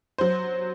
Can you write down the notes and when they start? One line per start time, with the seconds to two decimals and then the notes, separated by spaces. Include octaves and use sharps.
0.18 F#3 C5